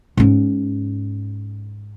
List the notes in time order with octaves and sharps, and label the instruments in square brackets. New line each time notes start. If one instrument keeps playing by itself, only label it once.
[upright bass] G#2 C#4